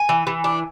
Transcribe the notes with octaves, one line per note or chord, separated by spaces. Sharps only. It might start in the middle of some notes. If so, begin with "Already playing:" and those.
Already playing: G#5
E3
E3
D4